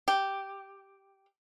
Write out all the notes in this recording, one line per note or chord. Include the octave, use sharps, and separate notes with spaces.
G4